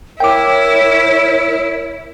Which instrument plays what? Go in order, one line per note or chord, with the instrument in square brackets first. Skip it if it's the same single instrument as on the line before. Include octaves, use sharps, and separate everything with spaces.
[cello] E4 [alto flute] A#4 [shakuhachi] C#5 [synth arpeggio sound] G5 D6